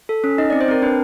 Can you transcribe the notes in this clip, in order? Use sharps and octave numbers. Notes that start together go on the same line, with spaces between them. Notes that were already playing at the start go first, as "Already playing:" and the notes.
A4
C#4
D#4 D#5
D5
C4
C5
C4 A#4
D4 B4